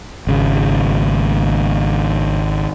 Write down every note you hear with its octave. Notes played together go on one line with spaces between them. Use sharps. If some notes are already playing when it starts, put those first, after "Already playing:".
G#1 C#3